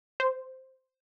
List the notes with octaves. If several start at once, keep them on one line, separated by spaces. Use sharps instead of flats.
C5